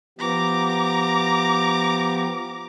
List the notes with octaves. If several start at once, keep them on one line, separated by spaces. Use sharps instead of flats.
F3 B3 G4 A#5 D6